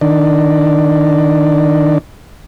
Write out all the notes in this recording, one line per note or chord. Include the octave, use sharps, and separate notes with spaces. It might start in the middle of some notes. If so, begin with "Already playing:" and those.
D#3 D4